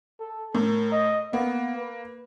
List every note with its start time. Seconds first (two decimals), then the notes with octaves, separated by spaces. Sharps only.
0.20 A4
0.55 A2 A#4
0.92 D#5
1.33 A#3 B3
1.77 B4